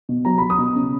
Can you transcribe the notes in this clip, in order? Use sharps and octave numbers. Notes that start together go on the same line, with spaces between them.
B2
F#3 A#5
F#3 B5
D#6
B2
C#3